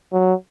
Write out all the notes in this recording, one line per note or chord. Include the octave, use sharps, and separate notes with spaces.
F#3